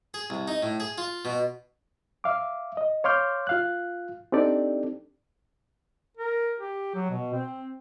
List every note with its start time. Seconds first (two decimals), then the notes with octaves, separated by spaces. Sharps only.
0.14 G#4
0.30 C2
0.48 D#4
0.62 A2
0.80 G#4
0.98 F4
1.25 B2
2.24 E5 F5 D6
2.77 D#5
3.04 C#5 F5 C6 D6 F6 G6
3.47 F4 F5 F#6
4.32 C4 D4 D#4 G4 A4 D5
6.17 A#4
6.60 G4
6.95 F#3
7.10 B2
7.33 C4